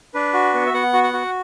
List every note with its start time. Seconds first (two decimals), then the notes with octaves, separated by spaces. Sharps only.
0.14 D4 B4
0.33 F#4
0.54 B3
0.66 E5
0.74 B3 F#5
0.93 F#4
1.03 F#5
1.13 F#4